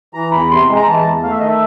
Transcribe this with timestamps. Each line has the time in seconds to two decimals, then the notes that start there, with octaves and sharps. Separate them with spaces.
0.14 E3 A#5
0.32 E2 B5
0.51 C3 C6
0.69 G#3
0.76 A#5
0.87 E3 A5
1.04 E2
1.23 A3 F5
1.31 E5
1.39 D#3 D#5
1.47 E5